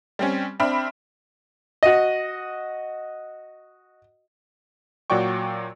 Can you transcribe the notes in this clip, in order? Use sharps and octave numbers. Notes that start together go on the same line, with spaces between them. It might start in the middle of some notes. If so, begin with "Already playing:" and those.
G3 C4 C#4
C4 D4 E5 B5 F6
F#4 D#5
A#2 F#3 F#4 D5 G5 C#6